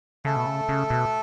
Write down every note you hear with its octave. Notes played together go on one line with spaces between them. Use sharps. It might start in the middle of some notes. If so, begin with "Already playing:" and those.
C#3 A3 A4
B2
C#3
C#3
B2